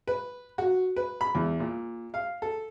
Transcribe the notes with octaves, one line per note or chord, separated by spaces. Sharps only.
B4
F#4
B4
B5
E2
A#2
F5
A4